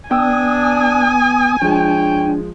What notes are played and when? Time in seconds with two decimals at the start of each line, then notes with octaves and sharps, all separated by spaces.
0.11 B3 D4 G5 G#5 D#6 E6
1.62 F3 G#3 D4 C#5 G5